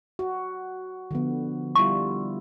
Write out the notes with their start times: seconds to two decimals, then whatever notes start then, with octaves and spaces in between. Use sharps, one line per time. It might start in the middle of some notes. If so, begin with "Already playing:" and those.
0.19 F#4
1.11 D3 F3 B3
1.76 G3 E4 F4 C#6